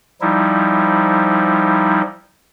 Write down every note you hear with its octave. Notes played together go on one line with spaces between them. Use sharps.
F3 G3 D#4 E4